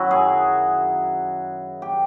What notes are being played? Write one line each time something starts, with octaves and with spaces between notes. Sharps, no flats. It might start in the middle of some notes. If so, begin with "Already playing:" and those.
Already playing: F#2 D#3 F#3 E4 F#4
G#4
G4